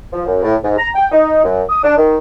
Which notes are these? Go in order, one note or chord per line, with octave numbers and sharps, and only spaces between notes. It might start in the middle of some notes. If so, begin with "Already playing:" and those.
F3
F#2
A2
G#2
A#5
G5
D#4
F#2
D#6
D4
D#3